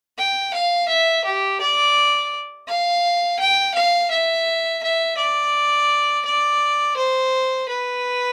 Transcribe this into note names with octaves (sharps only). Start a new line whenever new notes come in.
G5
F5
E5
G4
D5
F5
G5
F5
E5
E5
D5
D5
C5
B4